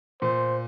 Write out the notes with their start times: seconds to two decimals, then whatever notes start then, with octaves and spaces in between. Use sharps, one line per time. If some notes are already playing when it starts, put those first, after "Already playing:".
0.22 A#2 C5